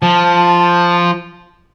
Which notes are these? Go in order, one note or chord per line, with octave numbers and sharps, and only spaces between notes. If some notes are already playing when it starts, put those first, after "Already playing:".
F3 A5